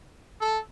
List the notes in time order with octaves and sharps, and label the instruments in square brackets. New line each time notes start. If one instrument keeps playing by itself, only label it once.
[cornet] A4